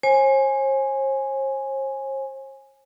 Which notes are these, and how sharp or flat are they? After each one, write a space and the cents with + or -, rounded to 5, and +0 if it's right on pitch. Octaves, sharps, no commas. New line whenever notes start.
C5 +45 G#5 +0